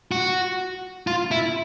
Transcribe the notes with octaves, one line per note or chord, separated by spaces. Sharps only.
F#4
F4
E4